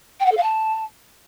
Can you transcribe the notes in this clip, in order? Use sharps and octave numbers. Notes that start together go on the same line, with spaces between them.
G5
F#5
A4
F5
A5